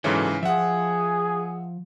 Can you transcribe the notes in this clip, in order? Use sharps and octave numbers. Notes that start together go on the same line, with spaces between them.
G#2 C#3 E3 F#3 A4 C#5
F3 G#4 E5 F#5